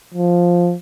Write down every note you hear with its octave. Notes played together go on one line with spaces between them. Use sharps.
F3